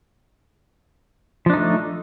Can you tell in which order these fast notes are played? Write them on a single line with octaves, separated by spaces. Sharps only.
F3 D4 D#4 A3